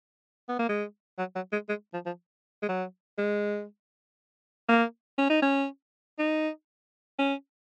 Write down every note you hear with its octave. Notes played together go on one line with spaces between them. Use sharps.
B3
A#3
G#3
F#3
F#3
G#3
G#3
F3
F3
G#3
F#3
G#3
A#3
C#4
D#4
C#4
D#4
C#4